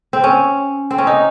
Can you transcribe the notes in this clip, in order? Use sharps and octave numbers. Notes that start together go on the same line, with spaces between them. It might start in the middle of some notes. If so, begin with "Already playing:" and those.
C4
C#4
C4
C#4
D#4